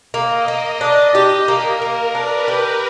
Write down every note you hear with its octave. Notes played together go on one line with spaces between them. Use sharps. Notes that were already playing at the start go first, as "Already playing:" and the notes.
A#3 D#5
A#3
D4
G4
A#3 A#4
A#3
D4 B4
G4